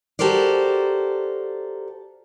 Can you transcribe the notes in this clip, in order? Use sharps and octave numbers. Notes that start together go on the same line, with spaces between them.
F#4 G4 A4 A#4 C5 D5